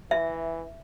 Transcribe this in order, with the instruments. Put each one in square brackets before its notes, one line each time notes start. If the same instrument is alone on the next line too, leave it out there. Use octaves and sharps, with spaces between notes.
[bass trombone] E3 [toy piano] E5